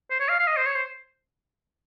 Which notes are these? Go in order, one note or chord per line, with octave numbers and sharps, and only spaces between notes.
C5
C#5
F5
F5
D#5
C5
C#5
C5